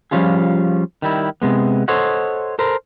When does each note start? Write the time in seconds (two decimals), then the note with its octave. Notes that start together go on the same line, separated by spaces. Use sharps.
0.11 F3 G3 C#4 F4 G#4
1.02 D#3 G3 E4
1.42 C3 G#3 B3
1.88 A4 C5 C#5 D#5 F#5
2.59 A4 A#4 C5